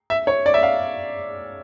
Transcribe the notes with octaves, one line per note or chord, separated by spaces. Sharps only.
E5
C#5
D5
E5
F5